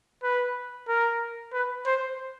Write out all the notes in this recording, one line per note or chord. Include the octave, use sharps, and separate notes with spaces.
B4
A#4
B4
C5